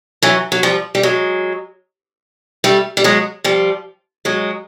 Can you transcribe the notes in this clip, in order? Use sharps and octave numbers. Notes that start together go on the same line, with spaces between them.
E3 F#3
F#3
F3 G3
G3
F#3 G#3
G3 A3
G3
F#3 G#3
F3 G3
F#3 G#3